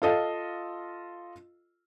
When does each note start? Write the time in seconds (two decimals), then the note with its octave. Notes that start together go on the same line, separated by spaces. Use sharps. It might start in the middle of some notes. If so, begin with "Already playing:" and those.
0.02 F4 A4 D#5 F5